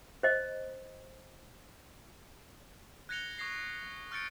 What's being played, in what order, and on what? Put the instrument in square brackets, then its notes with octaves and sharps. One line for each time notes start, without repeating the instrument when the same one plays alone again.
[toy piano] C5 D#5
[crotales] F#6 G#6 A#6 C#7 F7 G7
C#6 D#6 G#6 A#6 C7
C#6 F6 G6 A6 C#7 D7